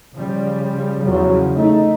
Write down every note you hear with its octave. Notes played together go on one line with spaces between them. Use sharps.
C#3 F3 G3
E2 C#3 F3 F#3
A3 D#4